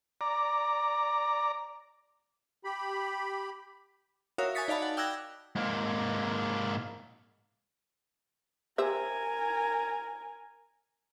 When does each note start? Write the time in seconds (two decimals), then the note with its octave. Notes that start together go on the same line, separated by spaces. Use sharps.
0.21 D5 A#5
2.65 G4 B5
4.38 F#4 A#4 C#5 E5 F5 D#6
4.55 G#5 C#6 D#6 A6 B6 C#7
4.68 D#4 D5 F5 A5 B5
4.82 F#5
4.97 G5 D6 E6 F#6 G#6 A#6
5.55 G#2 A#3
8.78 G4 A#4 C5 E5 G#5